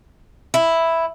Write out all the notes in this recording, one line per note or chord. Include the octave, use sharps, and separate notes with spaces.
E4